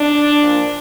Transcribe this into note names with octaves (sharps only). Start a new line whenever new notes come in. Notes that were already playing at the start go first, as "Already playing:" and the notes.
Already playing: D4
A#2 F3